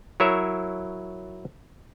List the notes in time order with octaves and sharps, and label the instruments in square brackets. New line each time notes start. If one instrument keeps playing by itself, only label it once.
[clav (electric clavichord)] F#3 E4 A#4 C#5 E5